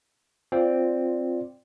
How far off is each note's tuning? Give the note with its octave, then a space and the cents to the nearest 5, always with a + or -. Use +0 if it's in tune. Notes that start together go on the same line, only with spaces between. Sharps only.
C4 +0 F4 +0 D5 +0